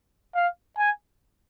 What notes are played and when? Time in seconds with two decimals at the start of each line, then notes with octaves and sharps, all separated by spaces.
0.35 F5
0.78 G#5